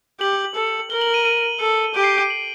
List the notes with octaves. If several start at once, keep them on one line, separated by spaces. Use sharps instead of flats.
G4 F#7
A4
A#4 G7
F#7
D#7
D#7
A4
G4 D7
C7
D7
D#7
F#7